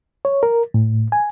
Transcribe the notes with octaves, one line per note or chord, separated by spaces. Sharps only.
C#5
A#4
A2
G#5